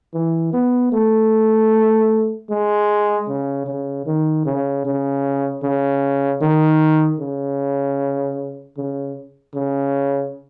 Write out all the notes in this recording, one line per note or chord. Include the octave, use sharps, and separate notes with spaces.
E3
B3
A3
G#3
C#3
C#3
D#3
C#3
C#3
C#3
D#3
C#3
C#3
C#3